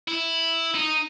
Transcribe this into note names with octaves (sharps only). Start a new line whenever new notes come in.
E4
D#4